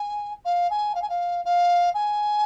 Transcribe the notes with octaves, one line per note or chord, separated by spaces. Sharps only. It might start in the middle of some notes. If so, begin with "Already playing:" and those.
Already playing: G#5
F5
G#5
F5
G#5
F5
F5
G#5